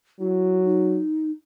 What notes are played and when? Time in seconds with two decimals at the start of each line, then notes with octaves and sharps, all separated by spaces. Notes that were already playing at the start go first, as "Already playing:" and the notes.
0.19 F#3 E4
0.64 D#4